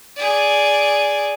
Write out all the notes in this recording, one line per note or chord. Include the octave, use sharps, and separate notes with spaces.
G#4 D5